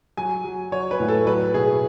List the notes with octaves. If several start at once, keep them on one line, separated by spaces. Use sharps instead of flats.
F#3 G#5
F#3
F#3 C#5
B4
A2
A4
F#3 B4
B2 G#4